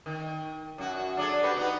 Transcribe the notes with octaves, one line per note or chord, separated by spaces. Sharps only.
D#3
F#2 F#4
D4 G#4 A4
F#4 G4 B4
B3 D#4